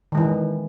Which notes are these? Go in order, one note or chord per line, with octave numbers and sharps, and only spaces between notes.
D#3 E3 G#3